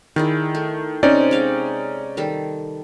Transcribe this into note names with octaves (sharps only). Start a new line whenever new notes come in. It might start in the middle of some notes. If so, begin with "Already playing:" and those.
D#3 E4 G#4 D5
A3
C3 C4 C#4 D#4 D5
G#3 F5 G5
D#3 G3 A4